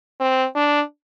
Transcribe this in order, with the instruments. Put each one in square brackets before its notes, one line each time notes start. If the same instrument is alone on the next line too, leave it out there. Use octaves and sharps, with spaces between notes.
[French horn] C4
D4